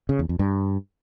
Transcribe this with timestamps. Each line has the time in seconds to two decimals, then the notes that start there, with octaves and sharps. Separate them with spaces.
0.09 C#3
0.19 E2
0.29 F2
0.39 G2